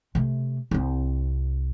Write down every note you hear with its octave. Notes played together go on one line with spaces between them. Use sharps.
C3 A3
C2 C4